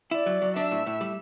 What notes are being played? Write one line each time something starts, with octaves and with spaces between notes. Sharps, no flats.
E4 D5
F#3
F#3
D4 E5
A2
A2
G3